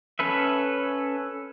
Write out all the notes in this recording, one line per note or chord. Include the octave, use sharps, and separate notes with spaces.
C#4 A4 B4 E5